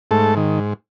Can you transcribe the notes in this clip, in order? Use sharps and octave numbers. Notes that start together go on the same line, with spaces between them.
G#2 A3 A4
D#3